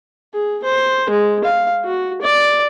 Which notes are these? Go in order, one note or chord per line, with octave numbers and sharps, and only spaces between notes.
G#4
C5
G#3
F5
F#4
D5